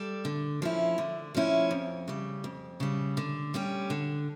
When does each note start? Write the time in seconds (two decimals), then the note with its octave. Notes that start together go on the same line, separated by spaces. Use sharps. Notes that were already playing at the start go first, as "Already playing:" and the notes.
Already playing: G3 A4 D5
0.25 D3
0.62 F3 C#4 E4
0.98 D3
1.35 F3 C#4 E4
1.71 F2
2.08 C#3 G3
2.44 F2
2.80 C#3 G3
3.17 D3
3.54 G3 C#4 G4
3.90 D3